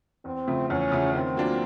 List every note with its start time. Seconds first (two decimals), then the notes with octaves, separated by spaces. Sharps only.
0.25 E2 C4
0.47 C#3 F3 A3
0.69 E2 C#4
0.91 C#3 F3 A3
1.14 D#3 C4
1.37 F#3 A#3 D4 F4